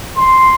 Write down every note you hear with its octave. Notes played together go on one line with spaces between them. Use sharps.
C6